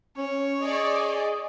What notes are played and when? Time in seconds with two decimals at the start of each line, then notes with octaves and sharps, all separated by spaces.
0.17 C#4 C#5
0.61 G#4 D5 D#5